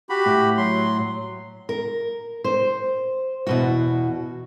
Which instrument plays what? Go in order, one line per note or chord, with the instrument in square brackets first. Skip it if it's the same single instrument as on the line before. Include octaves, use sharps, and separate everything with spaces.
[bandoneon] F#4 G4 B5
[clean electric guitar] A2
[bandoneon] F#3 C6
[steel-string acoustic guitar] A#4
C5
E2 B2 F#4